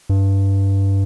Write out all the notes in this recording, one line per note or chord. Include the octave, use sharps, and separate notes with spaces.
G2